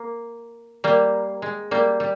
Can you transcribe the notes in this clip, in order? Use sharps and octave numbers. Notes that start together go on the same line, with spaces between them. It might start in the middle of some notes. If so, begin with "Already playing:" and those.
Already playing: A#3
G3 A#3
G#3
G3 A#3
G3